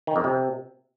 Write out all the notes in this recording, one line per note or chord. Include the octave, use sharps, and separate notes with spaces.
D#3
F2
C3